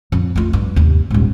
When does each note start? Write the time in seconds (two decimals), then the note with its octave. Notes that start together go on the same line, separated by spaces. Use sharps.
0.12 F2
0.36 A3 F4
0.53 G2
0.76 D#2 C3
1.10 D#1 G#2